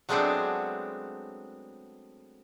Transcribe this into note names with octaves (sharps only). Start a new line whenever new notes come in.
F#3 G#3 A3 B3 C4 D4